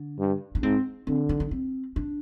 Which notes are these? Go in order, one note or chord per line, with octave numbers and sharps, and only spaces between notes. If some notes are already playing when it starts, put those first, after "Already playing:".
Already playing: D3
G2
D4
G#2 C4
D3 C4
D4
D4
C4
D4